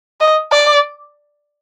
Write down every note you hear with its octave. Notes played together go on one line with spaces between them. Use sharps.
D#5
D5